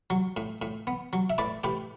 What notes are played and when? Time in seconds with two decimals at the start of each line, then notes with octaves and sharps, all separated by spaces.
0.10 F#3
0.37 A2
0.62 A2
0.87 B3
1.13 F#3
1.30 E5
1.38 A2 B4 D5
1.64 A2 G4 B4